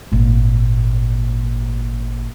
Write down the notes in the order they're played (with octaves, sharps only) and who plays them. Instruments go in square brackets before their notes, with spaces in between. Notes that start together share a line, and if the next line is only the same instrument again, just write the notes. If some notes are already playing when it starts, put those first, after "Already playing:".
[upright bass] G#1 A#2